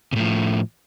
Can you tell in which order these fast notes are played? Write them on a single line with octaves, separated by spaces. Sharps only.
C3 A2 F3